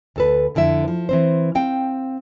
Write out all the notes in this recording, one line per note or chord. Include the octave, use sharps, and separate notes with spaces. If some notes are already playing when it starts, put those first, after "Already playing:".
D2 A4 B4
F2 D3 E4 E5
F3
E3 C4 C5
C4 F5 G5